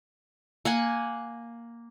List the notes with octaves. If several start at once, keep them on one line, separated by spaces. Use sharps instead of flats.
A#3 F#5 G#5